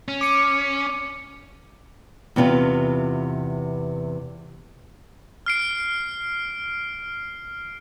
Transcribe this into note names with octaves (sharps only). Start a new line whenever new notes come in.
C#4
D6 C#7
E2 C3 B3 F4
F6 C7 D7